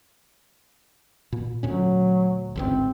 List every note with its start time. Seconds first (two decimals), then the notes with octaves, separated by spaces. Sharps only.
1.32 A#2
1.63 D2 A#2 F#3 C#4
2.56 G1 C#2 G#2 C4